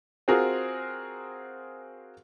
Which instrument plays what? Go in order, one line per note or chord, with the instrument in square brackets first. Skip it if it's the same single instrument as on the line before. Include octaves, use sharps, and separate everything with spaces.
[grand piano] C4 F4 F#4 G#4 A#4